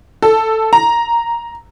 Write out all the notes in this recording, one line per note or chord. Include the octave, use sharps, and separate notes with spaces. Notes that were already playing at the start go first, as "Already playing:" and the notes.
A4
A#5